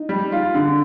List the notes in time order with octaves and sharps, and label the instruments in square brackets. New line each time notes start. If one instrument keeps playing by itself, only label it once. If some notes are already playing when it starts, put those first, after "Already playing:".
Already playing: [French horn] D#4
[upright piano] G3
[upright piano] F4 [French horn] G4
[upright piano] D3